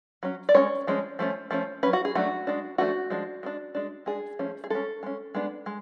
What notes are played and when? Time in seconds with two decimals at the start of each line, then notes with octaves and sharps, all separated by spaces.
0.23 F#3 C#4
0.49 D5
0.54 G#3 C#4 C#5
0.87 F3 G#3 C#4
1.19 F3 A3 C#4
1.51 F3 A3 C#4
1.83 F#3 C#4 B4
1.93 F#4
2.05 G#4
2.15 F#3 A3 D4 F#4
2.47 G#3 D4
2.78 F3 A3 D4 F#4
3.10 F3 G#3 D4
3.43 G#3 B3 D4
3.75 G#3 D4
4.06 G#3 D4 G#4
4.39 F3 A3 C#4
4.64 G#4
4.70 G#3 C#4 A4
5.03 G#3 C#4
5.35 G#3 B3 D4
5.66 G#3